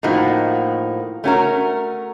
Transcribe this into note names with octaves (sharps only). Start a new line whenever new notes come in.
A2 F3 A#3 D#4 F#4
A3 C#4 F#4 A#4